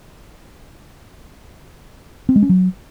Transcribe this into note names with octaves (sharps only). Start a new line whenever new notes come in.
C4
G#3
C#4
F#3